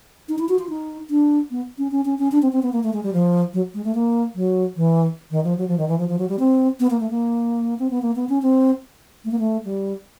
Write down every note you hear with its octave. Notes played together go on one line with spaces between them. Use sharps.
D#4
E4
F#4
F4
D#4
D4
B3
C#4
C#4
C#4
C#4
D4
C4
C4
B3
A#3
A3
G#3
G3
F3
F#3
G#3
A3
A#3
F#3
E3
D#3
F3
F#3
F3
D#3
E3
F3
F3
F#3
G3
C4
B3
A#3
A3
A#3
C4
B3
A#3
B3
C#4
C4
A3
A#3
A3
G3